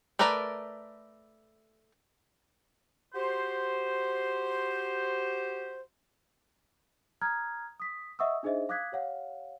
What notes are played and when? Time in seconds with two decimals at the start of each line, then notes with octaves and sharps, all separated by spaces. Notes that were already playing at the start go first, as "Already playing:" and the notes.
0.19 A3 A#4 B4 D5 A#5
3.14 F#4 G4 C5
7.22 A#5 D#6 F6 F#6 G#6
7.80 D#6 B6
8.19 D#5 E5 F#5 C#6 D#6 E6
8.43 D4 D#4 G#4 C5 D#5 E5
8.69 F5 D6 D#6 F#6 G#6 B6
8.92 G4 C#5 F5 F#5